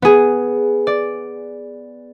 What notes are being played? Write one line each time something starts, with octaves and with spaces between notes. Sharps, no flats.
B3 G#4
D5